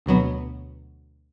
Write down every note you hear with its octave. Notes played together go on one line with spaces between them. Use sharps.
D2 B2 F#3 B3